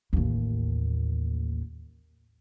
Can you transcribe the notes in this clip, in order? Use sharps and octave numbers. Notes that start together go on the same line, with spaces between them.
A1 D#2